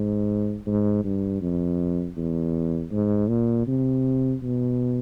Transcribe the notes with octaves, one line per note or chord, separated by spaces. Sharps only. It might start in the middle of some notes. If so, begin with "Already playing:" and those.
Already playing: G#2
G#2
G2
F2
E2
G#2
A#2
C3
B2